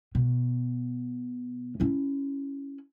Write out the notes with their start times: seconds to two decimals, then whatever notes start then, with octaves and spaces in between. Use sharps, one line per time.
0.15 B2
1.80 C#4 E4